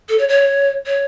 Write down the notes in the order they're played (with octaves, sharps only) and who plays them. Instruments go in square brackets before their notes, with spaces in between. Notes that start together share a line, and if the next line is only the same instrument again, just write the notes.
[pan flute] A4
C#5
C#5
C#5